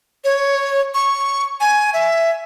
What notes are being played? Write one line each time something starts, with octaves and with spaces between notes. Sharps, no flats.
C#5
C#6
G#5
E5